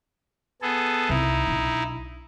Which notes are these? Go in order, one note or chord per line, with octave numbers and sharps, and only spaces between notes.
B3 G#4 A4
C2 D#4 E4
B1 D4